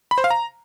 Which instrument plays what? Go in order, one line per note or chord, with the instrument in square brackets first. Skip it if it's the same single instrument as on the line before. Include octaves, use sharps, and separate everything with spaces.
[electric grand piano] B5
C5
F5
A#5